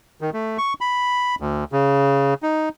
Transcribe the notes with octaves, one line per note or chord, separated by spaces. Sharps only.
D#3
A3
C#6
B5
D2
C#3
D#4